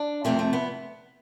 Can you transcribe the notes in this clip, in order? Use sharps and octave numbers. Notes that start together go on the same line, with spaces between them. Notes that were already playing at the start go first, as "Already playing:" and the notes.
Already playing: D4
F2 C3 F3 A3 C4
A3
B3